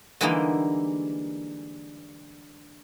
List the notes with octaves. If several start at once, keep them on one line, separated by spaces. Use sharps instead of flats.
D3 E3 G3 G#3 A#3 D#4